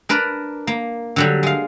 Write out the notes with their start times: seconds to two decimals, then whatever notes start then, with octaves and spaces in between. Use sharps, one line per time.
0.09 D4 A#4 B4 D5
0.67 A#3
1.16 D3 F#3 G3
1.43 G#3 F5